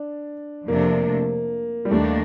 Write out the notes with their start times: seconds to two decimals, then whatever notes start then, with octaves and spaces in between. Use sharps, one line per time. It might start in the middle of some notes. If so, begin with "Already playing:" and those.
Already playing: D4
0.68 F2 C3 F3 A3 A#3 D4
1.85 G3
1.91 D#2 D#3 A3 A#3 D4